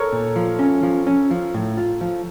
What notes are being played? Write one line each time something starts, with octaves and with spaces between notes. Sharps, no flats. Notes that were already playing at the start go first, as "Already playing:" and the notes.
Already playing: A4 A#4 C#5
A#2
F3
C#4
F3
C#4
F3
A2
F4
F3